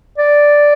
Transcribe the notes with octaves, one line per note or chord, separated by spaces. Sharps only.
D5